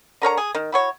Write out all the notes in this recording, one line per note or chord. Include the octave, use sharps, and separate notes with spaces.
D3 A#4 C#5 A#5
G#4
D#3
E4 F#4 C#5